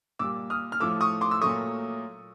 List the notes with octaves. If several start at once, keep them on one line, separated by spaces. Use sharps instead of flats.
A#2 G3 D6 E6
D#6 F6
F6
A2 F3 A3 D6 E6
C#6 D#6
C6 D6
E6
A#2 F#3 A3 C#6 D#6